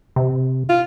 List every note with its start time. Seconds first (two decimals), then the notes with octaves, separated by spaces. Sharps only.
0.16 C3
0.69 F4